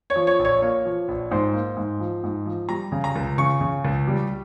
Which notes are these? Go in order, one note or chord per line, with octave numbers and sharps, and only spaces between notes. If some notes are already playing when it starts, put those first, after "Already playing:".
C#5
F3
C#5
A#1
C#5
A#3 C#5
F3
A#1
G#2 C5
A#3
G#2
F3
G#2
F3
G3 A#5
C#3
A#5
C#2
C#3 C#6
C#3
C#2
G3